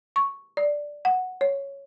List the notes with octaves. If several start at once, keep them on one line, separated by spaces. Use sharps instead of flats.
C#6
D5
F#5
C#5